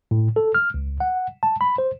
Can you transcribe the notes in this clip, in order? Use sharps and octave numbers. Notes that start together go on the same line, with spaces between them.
A2
A4
F6
C#2
F#5
A5
B5
C5